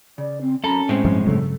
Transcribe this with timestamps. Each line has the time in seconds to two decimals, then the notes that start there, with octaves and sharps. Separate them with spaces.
0.18 C#3 D5
0.41 C4
0.64 F#2 C#4 A4 A#5 B5
0.89 A2 G#3 C4 C5
1.04 G2 F3 G3
1.26 G2 C#3 F#3 A4